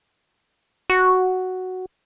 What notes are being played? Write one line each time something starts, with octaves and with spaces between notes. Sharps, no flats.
F#4